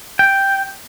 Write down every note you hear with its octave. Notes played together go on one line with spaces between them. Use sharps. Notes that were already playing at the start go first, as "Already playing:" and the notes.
G5